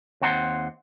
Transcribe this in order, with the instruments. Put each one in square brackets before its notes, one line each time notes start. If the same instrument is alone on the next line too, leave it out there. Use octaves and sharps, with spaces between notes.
[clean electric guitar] D#2 C4 F#5 A5 C6